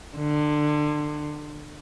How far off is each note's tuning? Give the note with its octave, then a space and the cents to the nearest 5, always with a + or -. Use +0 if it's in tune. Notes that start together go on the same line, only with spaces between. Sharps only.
D3 +25